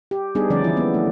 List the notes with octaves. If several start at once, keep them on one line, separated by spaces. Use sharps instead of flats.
G4
G3 B3 D4 D#4 G#4
D3 F3 G3 C#4 D5
E3 E4
A#3 B3
A3